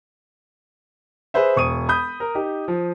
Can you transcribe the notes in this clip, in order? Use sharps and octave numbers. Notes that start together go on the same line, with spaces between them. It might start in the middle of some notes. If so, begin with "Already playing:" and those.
G#4 B4 C5 E5
E1 C#6 D#6 D#7
B5 D#6 G6
A#4
D#4 G4
F3